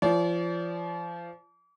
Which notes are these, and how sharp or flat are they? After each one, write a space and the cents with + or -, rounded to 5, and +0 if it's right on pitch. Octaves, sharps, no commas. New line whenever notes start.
F3 -30 D5 -40